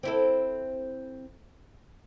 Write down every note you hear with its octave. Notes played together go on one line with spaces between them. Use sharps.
C4 E4 A4